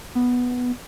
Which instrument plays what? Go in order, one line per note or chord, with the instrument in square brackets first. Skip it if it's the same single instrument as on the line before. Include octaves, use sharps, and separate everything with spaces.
[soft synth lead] B3